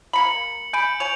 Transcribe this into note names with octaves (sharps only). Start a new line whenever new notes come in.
A#3 A#5 B5 C#7 F#7
G#5 B5 G6 D7
C#5 G#5 F7